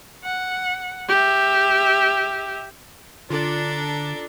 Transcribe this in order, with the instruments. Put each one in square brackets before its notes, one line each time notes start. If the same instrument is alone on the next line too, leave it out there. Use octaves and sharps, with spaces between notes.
[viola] F#5
G4 E5
[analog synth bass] D3 [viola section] D4 [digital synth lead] F4 [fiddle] A4 A#5